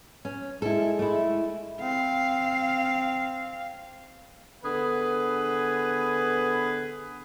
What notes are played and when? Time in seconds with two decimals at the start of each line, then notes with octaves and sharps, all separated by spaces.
0.25 C#4
0.62 G#3 E4 A4
0.99 A3 E4
1.81 C4 F5
4.64 D3 B3 G#4 B4